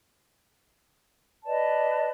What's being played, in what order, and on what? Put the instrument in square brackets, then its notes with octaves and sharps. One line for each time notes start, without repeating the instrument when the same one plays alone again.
[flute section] B4 D5 D#5 A5